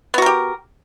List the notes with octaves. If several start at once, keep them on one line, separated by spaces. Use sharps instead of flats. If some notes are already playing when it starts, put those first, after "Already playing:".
B3 F#4 G4 A#4